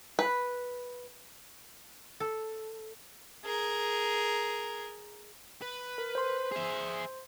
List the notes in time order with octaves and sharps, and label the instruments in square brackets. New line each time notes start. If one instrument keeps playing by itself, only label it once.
[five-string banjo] B4
[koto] A4
[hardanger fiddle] G#4 A#4
[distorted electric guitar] B4
[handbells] A#4
C5 C6
[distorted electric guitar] G#4 E5